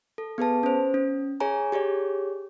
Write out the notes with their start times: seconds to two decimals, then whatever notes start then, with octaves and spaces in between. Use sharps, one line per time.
0.18 A4
0.38 B3 G#4 B4 A5
0.63 C#4 C5
0.94 C#4
1.40 G#4 C#5 G#5 A#5
1.72 G4 G#4 C#5 D5